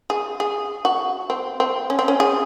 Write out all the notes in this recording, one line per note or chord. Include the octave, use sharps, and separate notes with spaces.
G#4
G#4
F#4
C4
C4
C#4
C4
C#4
G#4